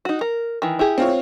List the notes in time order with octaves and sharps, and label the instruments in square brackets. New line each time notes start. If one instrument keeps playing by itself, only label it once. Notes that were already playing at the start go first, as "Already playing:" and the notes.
[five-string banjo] D#4 F#4
A#4
D#3 E3
E4 G4 G#4
[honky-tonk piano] C4 F4 C#5